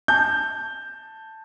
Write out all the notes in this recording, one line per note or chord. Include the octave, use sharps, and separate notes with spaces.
A5 G6